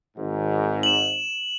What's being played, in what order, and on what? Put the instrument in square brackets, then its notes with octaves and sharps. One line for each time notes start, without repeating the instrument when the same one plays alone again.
[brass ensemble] G#1 G#2
[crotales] E7 F#7